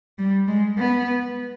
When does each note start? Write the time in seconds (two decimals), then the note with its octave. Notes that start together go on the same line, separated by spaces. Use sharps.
0.18 G3
0.48 G#3
0.78 B3